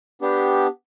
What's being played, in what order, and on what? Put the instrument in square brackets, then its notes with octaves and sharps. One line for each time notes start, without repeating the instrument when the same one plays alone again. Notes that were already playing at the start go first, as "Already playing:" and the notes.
[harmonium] B3 D4 G4